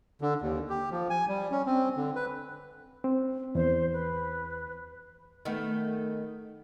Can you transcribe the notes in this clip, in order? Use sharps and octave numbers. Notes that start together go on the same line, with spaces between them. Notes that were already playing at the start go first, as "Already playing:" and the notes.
D3
D#2
G4
F3
G#5
G3
C#4
C4
D3
B4
C4
E2 C5
B4
D#3 A3 B3